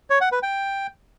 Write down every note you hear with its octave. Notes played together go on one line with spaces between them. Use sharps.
C#5
F#5
B4
G5